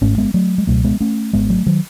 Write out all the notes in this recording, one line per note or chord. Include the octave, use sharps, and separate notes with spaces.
G#1 G#2 A3 C#4
G#3 B3
F#3 A3
G#3
C#2 B2 F#3 A3
G#3 B3
A3 C#4
G#1 G#2 G#3 B3
F#3 A3
D#3 F#3